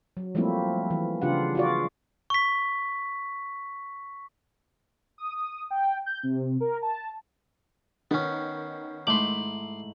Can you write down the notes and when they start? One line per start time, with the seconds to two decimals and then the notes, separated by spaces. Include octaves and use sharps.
0.17 F#3
0.35 F3 G3 A3 A#3 C4 E4
0.90 E3
1.22 C#3 D4 F4 G4 F#5
1.55 F4 F#4 D5
2.30 C#6 B6
5.18 D#6
5.34 D#6
5.71 G5
6.06 G6
6.23 C3
6.60 A#4
6.82 A5
8.11 D#3 B3 C#4
9.07 G#2 A3 E4 C6 D6 F#7